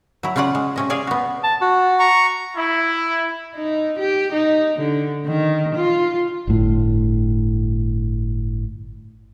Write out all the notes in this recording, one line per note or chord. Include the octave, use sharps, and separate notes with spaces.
F#3 E4
C#3 C#4 F4 D5 F#5
G#3
C3 C#4 D#5
G#4 D5 F5 G#5
B3 F#4
A5
F#4
A#5 C#6
E4
D#4
G4
D#4
D3
D#3
F4
G1 A2